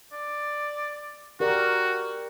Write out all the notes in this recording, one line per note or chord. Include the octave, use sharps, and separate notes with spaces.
D5
F#4 G4 A#4 D5